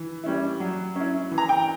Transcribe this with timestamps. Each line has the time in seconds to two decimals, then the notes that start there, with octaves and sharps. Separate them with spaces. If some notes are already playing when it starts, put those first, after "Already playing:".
Already playing: E3
0.24 G3 C#4 E4
0.60 F#3
0.96 C#4 E4
1.32 E3
1.38 A#5
1.49 G5